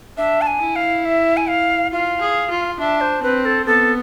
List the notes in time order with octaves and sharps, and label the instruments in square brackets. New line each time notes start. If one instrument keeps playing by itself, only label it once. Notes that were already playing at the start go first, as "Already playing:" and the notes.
[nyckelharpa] D4 [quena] E5
[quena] A5
G#5
[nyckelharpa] E4
[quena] F5
E5
G#5
F5
[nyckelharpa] F4 [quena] F5
[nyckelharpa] G#4
F4
[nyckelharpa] D4 [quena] E5
[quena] C5
[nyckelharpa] C4 [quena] B4
[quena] A4
[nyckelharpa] B3 [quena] A4